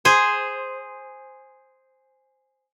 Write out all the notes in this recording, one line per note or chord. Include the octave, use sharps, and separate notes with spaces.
G#4 C5